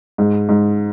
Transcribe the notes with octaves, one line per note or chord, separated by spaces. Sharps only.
G#2
G#2